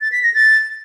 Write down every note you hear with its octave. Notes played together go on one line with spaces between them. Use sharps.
A6
B6
A#6
A6